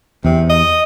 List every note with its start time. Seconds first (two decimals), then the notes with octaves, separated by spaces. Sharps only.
0.24 E2 C3
0.50 D#5